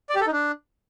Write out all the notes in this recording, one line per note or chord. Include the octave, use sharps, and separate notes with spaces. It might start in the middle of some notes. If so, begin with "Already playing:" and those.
D5
G4
A4
D#4
D4